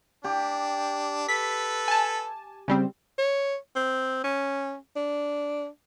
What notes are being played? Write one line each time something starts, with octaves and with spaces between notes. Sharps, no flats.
D4 G4
A4 B4 B6
G#5 A5
C#3 G3 C4
C#5
C4
C#4
D4